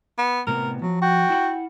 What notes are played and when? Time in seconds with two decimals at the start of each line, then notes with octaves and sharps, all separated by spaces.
0.18 B3
0.47 A2 C3 B3 A#4
0.82 F3 F#3
1.02 F#4 G5
1.30 E4 F#5